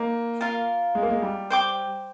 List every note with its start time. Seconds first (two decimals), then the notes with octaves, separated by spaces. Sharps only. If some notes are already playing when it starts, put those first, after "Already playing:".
Already playing: A#3 D#4
0.41 F4 A#4 F5
0.95 G#3
1.03 A#3
1.09 G#3
1.22 G3
1.50 C5 G5 D6